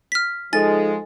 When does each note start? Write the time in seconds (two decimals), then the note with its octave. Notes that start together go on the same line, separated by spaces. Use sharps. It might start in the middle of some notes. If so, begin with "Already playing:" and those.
0.12 F6 B6
0.53 F3 G#3 D#4 A4 D#5 G#5 A6